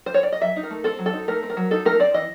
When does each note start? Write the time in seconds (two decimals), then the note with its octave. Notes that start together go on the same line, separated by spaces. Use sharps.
0.06 C5
0.14 C#5
0.23 D5
0.32 D#5
0.41 F#3 E5
0.56 D#4
0.63 A#4
0.70 A3
0.84 C4 A4
0.99 F#3
1.06 A4
1.13 D#4
1.28 A3 A#4
1.43 C4
1.50 A#4
1.57 F#3
1.71 D#4 A4
1.85 A3 A#4
2.00 C4 D5
2.14 E3 D#5